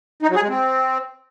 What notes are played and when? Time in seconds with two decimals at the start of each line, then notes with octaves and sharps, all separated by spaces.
0.23 D#4
0.29 F#3
0.36 G#4
0.42 G#3
0.49 C4